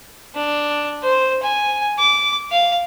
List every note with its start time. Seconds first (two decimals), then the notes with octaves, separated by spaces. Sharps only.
0.35 D4
1.03 C5
1.43 G#5
1.99 D6
2.51 F5